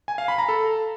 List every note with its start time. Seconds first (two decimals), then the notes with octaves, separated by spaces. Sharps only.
0.08 G#5
0.18 F5
0.28 B5
0.38 A#5
0.49 A4